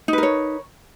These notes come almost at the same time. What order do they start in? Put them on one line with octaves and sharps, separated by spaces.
D#4 B4 A#4 C#5